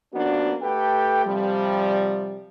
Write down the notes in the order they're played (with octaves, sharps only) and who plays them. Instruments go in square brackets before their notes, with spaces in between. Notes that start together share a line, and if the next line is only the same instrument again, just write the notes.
[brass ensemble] F3 A#3 B3 C#4 D4 F#4
A3 G4 A4 B4 G5
C3 F3 G3